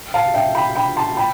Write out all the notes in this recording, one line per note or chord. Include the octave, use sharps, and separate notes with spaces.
F5 A5
E5 G5
G5 B5
G5 B5
A5 C6
G5 B5